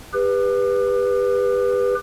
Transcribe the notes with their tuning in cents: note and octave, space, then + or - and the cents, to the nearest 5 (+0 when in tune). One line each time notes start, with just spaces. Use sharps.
G4 +35 B4 +0